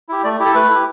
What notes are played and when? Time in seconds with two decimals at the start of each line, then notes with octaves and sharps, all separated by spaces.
0.09 E4 G4
0.24 A3 D5
0.40 E4 G4
0.45 A4
0.55 A3 B4
0.70 E4 G4